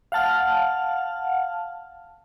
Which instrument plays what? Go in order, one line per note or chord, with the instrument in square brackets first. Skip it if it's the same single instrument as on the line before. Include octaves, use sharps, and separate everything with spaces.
[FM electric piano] F5 F#5 A5 F6